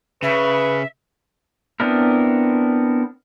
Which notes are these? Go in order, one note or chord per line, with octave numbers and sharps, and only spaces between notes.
C#3 B4 E5
B3 C4 D4 E4 A#4